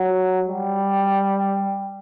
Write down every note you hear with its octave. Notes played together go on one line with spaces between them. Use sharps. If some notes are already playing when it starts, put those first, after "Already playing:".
Already playing: F#3
G3